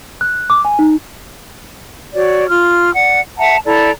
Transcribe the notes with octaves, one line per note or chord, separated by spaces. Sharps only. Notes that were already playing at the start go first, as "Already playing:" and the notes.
F#6
D6
G#5
D#4
F#4 C#5 D5
F4 F6
D5 F#5
E5 F#5 A5 A#5
E4 A4 D5 A#5